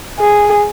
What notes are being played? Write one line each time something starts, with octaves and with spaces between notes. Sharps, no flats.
G#4